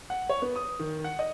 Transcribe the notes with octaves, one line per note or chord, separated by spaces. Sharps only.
F#5
C#5
B3
D#6
D#3
F#5
D#5